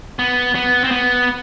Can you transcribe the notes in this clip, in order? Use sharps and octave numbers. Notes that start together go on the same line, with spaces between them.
B3
B3
C4
B3